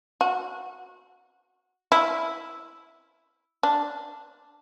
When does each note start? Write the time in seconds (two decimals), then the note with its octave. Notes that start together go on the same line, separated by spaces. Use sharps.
0.21 F#4
1.92 E4
3.63 D4